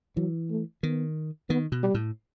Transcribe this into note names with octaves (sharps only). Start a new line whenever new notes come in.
E3 F#3
A3
D#3 B3
D#3 B3
B2
G3
A2